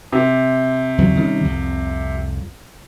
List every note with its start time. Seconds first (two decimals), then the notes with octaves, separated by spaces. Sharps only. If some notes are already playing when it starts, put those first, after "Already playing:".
0.13 C3
0.98 E2 C#3 F#3
1.15 D#3 G3 C#4
1.44 C2 F2